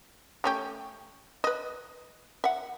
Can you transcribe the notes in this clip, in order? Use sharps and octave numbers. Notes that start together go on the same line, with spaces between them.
A3 C#4 G4
B4 D#5
E5 F#5